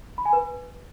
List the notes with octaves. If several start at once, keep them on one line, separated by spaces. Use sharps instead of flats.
B5
G#5
B4